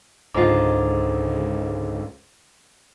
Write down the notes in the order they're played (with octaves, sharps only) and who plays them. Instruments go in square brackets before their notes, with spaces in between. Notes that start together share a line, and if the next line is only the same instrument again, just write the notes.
[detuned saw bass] C#2 [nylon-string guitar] G#2 D3 F4 [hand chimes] C5 A#5 D6